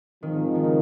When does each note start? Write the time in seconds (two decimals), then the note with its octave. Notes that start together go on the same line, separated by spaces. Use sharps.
0.23 G#2 D#3 F3 C4 D#4
0.55 D#3
0.64 C#3